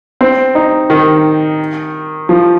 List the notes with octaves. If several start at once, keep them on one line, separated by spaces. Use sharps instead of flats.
C4
D#4
D#3
F3